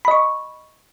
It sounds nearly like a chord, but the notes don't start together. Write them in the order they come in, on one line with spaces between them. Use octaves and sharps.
B5 D#5 C#6